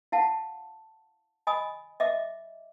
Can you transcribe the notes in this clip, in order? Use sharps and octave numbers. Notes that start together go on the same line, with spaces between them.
E4 F5 F#5 A5
D#5 G#5 B5 D#6
D#5 E5 D6